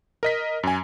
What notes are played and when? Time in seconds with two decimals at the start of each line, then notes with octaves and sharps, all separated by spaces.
0.23 A#4 D#5 B6
0.63 F#2 G#5